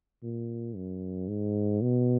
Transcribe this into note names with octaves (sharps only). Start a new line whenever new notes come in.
A#2
F#2
G#2
B2